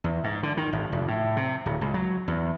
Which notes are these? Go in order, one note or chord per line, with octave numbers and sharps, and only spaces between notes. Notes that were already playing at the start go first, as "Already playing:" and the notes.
E2
G#2
D3
D#3
G#1
F1
A2
C3
D1
C#2
F#3
E2